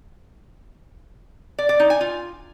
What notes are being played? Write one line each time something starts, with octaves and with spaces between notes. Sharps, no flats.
D5
D5
D#4
G#5
F4